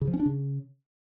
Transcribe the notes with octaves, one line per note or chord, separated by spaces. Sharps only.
C#3
F3
C#4
D4
C#3